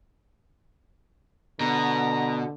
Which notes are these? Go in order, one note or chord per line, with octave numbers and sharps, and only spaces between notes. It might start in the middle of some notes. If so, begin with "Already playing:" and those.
B2 D3 A#5